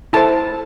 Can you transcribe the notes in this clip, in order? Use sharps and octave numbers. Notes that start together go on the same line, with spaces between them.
E4 A4 C5 A5